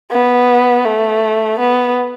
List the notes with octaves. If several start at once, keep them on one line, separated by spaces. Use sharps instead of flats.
B3
A3
B3